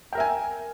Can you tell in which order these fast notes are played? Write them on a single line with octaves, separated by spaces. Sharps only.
G5 A#4 E5 G#5